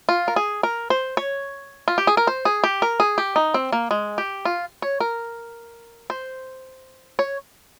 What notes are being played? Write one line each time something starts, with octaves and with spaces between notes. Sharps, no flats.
F4
A#4
G#4
A#4
C5
C#5
F4
G4
G#4
A#4
C5
G#4
G4
A#4
G#4
G4
D#4
C4
A#3
G#3
G4
F4
C#5
A#4
C5
C#5